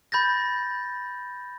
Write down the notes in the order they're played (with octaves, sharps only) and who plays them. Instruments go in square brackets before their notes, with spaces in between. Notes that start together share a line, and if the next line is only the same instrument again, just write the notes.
[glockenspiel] B5 G6 A6 A#6